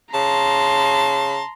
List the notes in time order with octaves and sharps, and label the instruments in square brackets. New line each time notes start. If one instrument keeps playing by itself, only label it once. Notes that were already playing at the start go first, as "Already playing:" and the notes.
[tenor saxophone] C#3 [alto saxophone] A5 [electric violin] A#5 C6